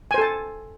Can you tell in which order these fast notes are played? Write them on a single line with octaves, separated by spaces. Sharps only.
G#5 C5 A4 A5